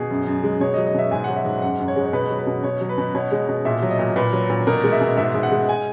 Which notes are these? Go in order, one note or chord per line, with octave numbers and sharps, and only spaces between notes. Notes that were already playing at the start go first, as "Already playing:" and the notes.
Already playing: B2 G#4
F#2
F#2
G#3
B2 C#5
D#5
F#3
D#5
B2 E5
G#2 G#5
F#3 F#5
E5
G#2
F#2 F#5
F#2
C#5
G#3
C#5
B2 B4
F#3
B4
B2
B2 C#5
F#3
B4
B2
B2 C#5
G#3
B2
A#2 E5
F#3
D#5
A#2
A#2 B4
F#3
A#2
B2 A#4
G#3
E5
B2
G#2 E5
G#2
F#5
G#3
G#5